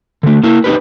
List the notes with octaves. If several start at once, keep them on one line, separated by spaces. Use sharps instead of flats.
D3 A3
A#3 E4
C4 D#4 G4 B4